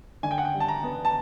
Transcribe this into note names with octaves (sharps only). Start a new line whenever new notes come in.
D3 G#5
G5
F#5
G5
G3
A5
A#5
B3
A5